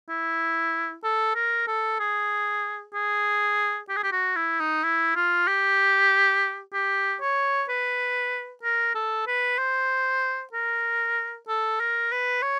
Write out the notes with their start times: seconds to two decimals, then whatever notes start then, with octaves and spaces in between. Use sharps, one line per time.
0.09 E4
1.04 A4
1.35 A#4
1.67 A4
1.99 G#4
2.94 G#4
3.89 G4
3.96 G#4
4.04 G4
4.12 F#4
4.36 E4
4.60 D#4
4.83 E4
5.16 F4
5.47 G4
6.73 G4
7.21 C#5
7.69 B4
8.63 A#4
8.95 A4
9.27 B4
9.58 C5
10.52 A#4
11.48 A4
11.80 A#4
12.12 B4
12.42 C#5